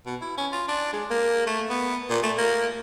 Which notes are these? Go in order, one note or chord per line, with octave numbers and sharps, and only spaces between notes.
B2
E4
C#4
F4
D4
G#3
A#3
A3
B3
A#2
A3
A#3